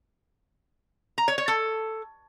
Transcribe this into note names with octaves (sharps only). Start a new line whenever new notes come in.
A#5
C#5
C#5
A4